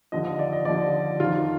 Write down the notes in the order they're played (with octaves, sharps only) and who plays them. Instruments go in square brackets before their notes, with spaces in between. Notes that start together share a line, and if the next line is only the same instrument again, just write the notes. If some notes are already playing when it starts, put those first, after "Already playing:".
[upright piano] D#2 D3 F3 D#5
D#5
D5
D#5
D#2 D3 F3 D5
F2 D#3 F4